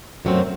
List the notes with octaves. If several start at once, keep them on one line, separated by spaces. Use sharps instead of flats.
F#2 F#3 A3 C4